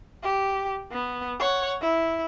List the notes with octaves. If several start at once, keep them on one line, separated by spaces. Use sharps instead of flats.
G4
B3
C#5 F#5
E4